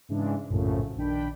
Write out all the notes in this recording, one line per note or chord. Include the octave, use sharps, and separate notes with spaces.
G#2 C#3 E3 G#3 D4
A#1 F#2 A2 C#3 F3
A#1 D#3 D4 G5 B5